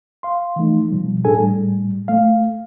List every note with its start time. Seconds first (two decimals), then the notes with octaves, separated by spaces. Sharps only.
0.23 F5 C6
0.56 E3 F3 A3 D#4
0.91 B2 F3 G3
1.25 A2 D4 G#4 A4 G#5
1.36 A2 G3
2.08 A3 F5